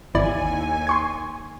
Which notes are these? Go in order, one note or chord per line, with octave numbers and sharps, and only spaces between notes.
G#1 D#2 E4 D5 G#5
C6 C#6 G#6